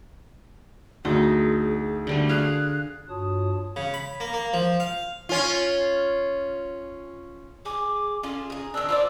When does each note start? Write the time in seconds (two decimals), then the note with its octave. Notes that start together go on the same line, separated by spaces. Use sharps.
1.05 D2 D#4 G#4
2.07 D3 G3 A3
2.29 G#4 F5 F#6
3.09 G2 F4 F#4 C#5 A5 D#6
3.76 C#3
3.94 B5
4.20 A#3
4.33 A#3
4.53 F3
4.80 F5
5.29 C#4 F4
7.65 G#4 D6
8.23 C#4 F4 G#4 A4
8.50 D#4 G#4
8.74 D#3 D4 E6
8.89 F4 C5 D5 E6